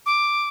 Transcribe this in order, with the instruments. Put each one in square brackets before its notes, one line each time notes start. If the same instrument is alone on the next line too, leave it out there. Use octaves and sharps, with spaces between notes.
[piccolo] D6